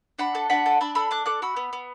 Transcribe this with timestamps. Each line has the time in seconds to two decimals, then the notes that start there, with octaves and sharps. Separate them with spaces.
0.19 D4 F#5 B5
0.35 A4
0.50 D4 F#5 B5
0.66 A4
0.81 D4 B5 E6
0.95 A4 B5 E6
1.11 D4 D6 F#6
1.26 A4 D6 F#6
1.42 F#4 B5 E6
1.56 B3
1.73 B3